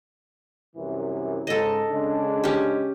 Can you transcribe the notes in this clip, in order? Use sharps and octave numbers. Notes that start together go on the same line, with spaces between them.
C2 F#2 E3
G#2 C#3 A4 D#5
C#3 G#3 D4
C#4 G4